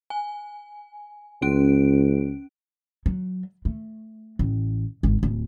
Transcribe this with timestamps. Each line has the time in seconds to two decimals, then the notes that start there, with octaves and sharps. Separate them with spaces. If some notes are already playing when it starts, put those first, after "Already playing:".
0.10 G#5
1.42 C#2 C#4 D7
3.06 F#3
3.65 A3
4.39 A1
5.03 G#1
5.23 D1